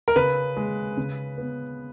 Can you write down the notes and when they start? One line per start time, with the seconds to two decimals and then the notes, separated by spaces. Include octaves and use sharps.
0.08 A#4
0.16 C#3 B4
0.57 G#3
0.97 C#3
1.38 B3